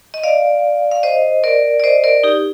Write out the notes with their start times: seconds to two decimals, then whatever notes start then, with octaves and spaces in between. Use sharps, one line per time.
0.14 D#5
0.24 D5 F5
0.91 F5
1.03 C5 D#5
1.44 A#4 D5
1.80 D5
1.84 C5 D#5
2.04 A#4 D5
2.24 D#4 G4